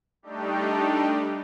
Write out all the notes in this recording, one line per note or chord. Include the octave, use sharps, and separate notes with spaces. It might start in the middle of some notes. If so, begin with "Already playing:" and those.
G3 A3 D4 D#4 G4